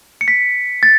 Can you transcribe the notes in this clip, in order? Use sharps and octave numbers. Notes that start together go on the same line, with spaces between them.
C#7
B6
A6